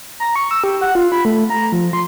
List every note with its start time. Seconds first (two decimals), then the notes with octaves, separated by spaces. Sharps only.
0.20 A#5
0.36 C#6
0.51 E6
0.64 G4
0.81 F#5
0.95 F4
1.12 B5
1.25 A3
1.50 A#5
1.72 F3
1.93 C6